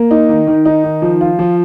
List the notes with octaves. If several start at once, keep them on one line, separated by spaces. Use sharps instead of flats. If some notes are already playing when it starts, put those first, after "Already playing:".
Already playing: A#3
D#4
D#3
D#3
D#4
D#3
F3
F4
F3